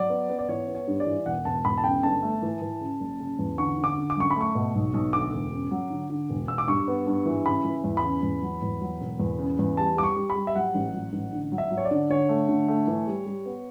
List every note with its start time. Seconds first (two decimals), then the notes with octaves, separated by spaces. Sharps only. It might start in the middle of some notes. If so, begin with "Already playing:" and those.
Already playing: F#3 D5
0.10 B3
0.29 B3
0.39 D5
0.48 E3 C#5
0.67 B3
0.75 C#5
0.87 G2
1.00 D5
1.06 E3
1.26 E1 F#5
1.45 E1 A5
1.65 E1 B5
1.78 A5
1.84 C#3 G5
2.03 G1 A5
2.23 A3
2.42 E3
2.61 E3
2.81 C#3
3.00 F#1
3.20 C#3
3.39 E2
3.58 D3 C#6
3.78 D3
3.84 D6
3.98 D3
4.10 D6
4.17 F#2 C#6
4.31 B5
4.36 A3 C#6
4.55 B2
4.75 B1
4.94 B1
5.13 D2 D6
5.33 E1
5.52 C#3
5.71 F#3
5.90 D3
6.10 D3
6.30 E1
6.48 E1 E6
6.58 D6
6.67 G2 C#6
6.88 B3
7.07 G2
7.26 E3
7.46 C#3 B5
7.65 E3
7.84 E2
7.97 B5
8.03 C#3
8.23 E2
8.42 F#3
8.62 E2
8.81 F#3
9.01 E1
9.20 E2
9.39 C#3
9.59 E2
9.77 G3 A5
9.97 G3 D6
10.03 C#6
10.16 G3
10.30 B5
10.36 G3
10.47 E5
10.55 F#3 F#5
10.75 A1
10.94 F#3
11.13 A1
11.33 D3
11.52 F#3
11.58 E5
11.71 F#3
11.77 C#5
11.85 D5
11.91 D3
12.10 D3 C#5
12.29 A3
12.49 D3
12.68 A3
12.87 E3
13.07 G3
13.26 G3
13.46 B3